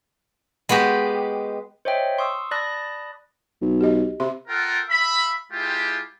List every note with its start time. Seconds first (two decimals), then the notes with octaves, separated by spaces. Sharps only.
0.69 G#3 B3 F#4 G4
1.85 C5 C#5 D#5 E5 G5
2.18 C6 C#6 D#6 E6
2.51 D5 A5 B5 D#6 F#6 A#6
3.61 B1
3.81 G4 D#5
4.20 C3 E5 C6
4.48 F4 A4 A#4 F#5 G5
4.90 E5 F5 B5
5.52 G#3 E4 F4 G4